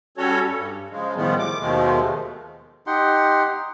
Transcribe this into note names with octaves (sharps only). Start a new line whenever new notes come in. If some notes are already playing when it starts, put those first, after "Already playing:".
G3 C#4 F#4 A4 C#5
G2
C#3 F3 G#3
A2 D#3 F3 G3 G#3 B3
D6
D#2 B2 D#3 F3 G#3 A3
D#4 G4 F#5 C6